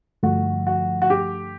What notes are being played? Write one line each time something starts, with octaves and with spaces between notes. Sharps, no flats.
G2 D3 F3 A3 F#4
F#4
F#4
G4